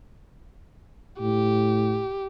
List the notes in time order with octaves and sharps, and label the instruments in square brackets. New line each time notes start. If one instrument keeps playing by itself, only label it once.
[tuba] A2 [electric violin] G4